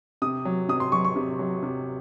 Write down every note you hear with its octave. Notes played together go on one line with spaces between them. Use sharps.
C3 D#6
F#3
C3 D#6
C6
F#3 C#6
C#6
C3
F#3
C3